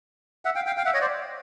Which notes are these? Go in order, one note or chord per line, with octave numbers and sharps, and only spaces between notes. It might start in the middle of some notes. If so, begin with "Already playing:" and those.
E5 F#5
F5 G5
F5 G5
F5 G5
E5 F#5
C#5 D#5
C5 D5